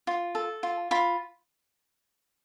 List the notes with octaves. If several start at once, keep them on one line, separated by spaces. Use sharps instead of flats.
F4
A4
F4
F4 B5